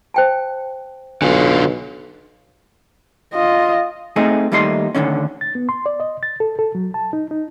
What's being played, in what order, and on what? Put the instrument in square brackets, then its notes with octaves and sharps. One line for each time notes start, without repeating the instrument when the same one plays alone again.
[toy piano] C5 G5 A5
[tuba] B1 [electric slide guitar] D3 F4 [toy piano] G#5
[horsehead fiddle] F4 D#5
[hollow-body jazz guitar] A3 C4 D#4 G#4
D#2 G3 A3 D#4 A4 C6
D2 G2 D3 D#3 C#4
[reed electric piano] A6
B3
C6
D5
D#5
A6
A4
A4
F#3
A5
D#4
D#4